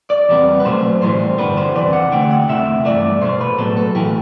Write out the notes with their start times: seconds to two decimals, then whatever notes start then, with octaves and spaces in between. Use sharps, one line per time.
0.10 D5
0.29 E2 C3 G3 B3
0.60 B4
0.65 B2 F#3 A3 C5
1.02 A2 E3 G3 C5
1.38 G2 D3 G3 B3 B4
1.57 C5
1.75 E2 C3 E3 D5
1.93 F#5
2.12 D2 D3 A3 G5
2.31 F#5
2.48 E2 C3 E3 A3 E5
2.85 G2 E3 A3 D5
3.21 B2 A3 C5
3.41 B4
3.58 A2 F#3 B3 A4
3.77 A4
3.95 A2 E3 A3 G4